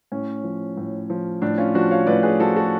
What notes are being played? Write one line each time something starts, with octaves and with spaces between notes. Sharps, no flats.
A2 C#4
F3
A2
F3
A2 D4
C#4 F4
F3 D4 F#4
C#5 F5
A2 B4 D5
G#4 B4
F3 F#4 A4
F#4 A4